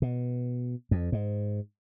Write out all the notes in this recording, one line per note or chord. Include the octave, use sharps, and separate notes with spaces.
B2
F2
G#2